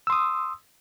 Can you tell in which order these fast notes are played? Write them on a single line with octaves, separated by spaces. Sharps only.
E6 C6 D#6